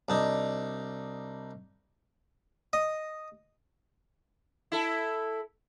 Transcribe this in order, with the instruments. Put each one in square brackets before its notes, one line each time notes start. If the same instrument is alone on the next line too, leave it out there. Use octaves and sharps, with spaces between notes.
[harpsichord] C2 D4 D#4
D#5
[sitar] E4 A4